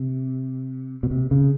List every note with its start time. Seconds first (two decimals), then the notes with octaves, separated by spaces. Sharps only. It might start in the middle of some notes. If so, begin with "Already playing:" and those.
Already playing: C3
1.03 B2
1.11 C3
1.31 C#3